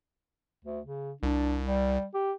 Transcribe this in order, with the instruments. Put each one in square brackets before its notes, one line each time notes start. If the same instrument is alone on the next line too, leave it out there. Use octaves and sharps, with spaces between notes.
[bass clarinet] D2
C#3
[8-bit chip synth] C2 [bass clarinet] D4
[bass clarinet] G3
G4